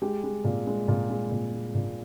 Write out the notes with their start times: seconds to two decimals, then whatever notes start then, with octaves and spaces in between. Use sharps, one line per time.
0.02 G#3 G4
0.24 G#3
0.44 A#2
0.67 G#3
0.88 A#2
1.10 G#3
1.31 A#2
1.53 G#3
1.75 A#2